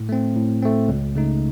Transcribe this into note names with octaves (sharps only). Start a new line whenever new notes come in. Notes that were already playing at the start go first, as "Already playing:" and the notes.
Already playing: A2
A3 C4
A2
A3 C4
C#2
C#3 A3 D#4